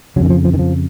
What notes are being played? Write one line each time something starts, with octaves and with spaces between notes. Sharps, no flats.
F2 C#3 F#3
D#3
F3
F3
D#3
F3